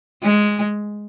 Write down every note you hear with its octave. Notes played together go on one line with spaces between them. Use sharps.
G#3